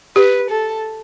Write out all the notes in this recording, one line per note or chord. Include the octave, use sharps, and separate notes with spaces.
G4 B4
A4